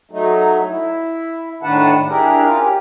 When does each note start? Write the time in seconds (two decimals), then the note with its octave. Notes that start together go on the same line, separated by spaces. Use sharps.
0.11 F#3 A3 D#4
0.69 E4
1.63 A2 D#3 D4 B4 F#5 A5
2.08 D4 E4 G4 G#4 A#4
2.43 C#4 F4 A#4
2.62 G4